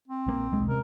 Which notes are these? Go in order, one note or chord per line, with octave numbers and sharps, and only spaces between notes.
C4
A#1 E3 A#3
D#1 B1 G#3
C3 G#3 C4 A#4